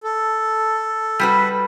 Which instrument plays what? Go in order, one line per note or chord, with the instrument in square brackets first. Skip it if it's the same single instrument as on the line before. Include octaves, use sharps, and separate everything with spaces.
[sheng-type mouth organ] A4
[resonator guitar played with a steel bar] G3 F#4 B4